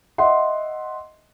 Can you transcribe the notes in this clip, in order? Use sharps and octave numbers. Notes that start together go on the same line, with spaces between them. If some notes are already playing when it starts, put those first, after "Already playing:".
D#5 E5 F#5 C6